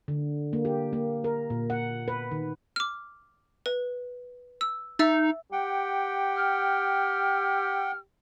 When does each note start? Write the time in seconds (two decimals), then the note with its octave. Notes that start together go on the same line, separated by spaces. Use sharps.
0.08 D3
0.53 A#3
0.65 G4
0.93 A#3
1.24 A#4
1.50 A#2
1.70 F#5
2.08 B4
2.31 D#3
2.76 D6 F6
3.66 B4
4.61 E6
4.99 D#4 E5 E6 A6
5.52 G4 F#5 G5
6.37 F6